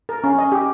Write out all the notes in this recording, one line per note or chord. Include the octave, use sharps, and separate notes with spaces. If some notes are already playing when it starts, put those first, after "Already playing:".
A#4
C#4
D#5
G4